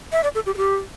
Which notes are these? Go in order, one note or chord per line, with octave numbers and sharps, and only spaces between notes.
E5
D5
A4
G4
A4
G4